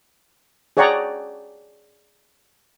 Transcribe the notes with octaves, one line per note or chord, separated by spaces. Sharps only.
G#4 C#5 D5 F#5 G5 A#5